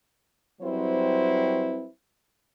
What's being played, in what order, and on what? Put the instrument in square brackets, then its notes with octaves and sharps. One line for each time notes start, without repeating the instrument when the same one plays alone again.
[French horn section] F#3 G3 C4 E4 B4 C5